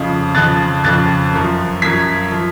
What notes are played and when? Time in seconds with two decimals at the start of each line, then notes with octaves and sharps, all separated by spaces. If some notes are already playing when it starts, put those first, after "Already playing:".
Already playing: F2 C#3 F3
0.35 F2 C#3 F3 F#6 A6
0.84 F2 C#3 F3 F#6 A6
1.33 F#2 F3
1.82 F#2 F3 G#6 B6
2.32 F3